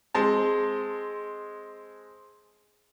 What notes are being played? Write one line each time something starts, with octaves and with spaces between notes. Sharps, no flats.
G#3 C4 A5